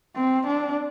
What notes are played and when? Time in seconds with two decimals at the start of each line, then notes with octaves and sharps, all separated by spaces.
0.16 C4
0.47 D4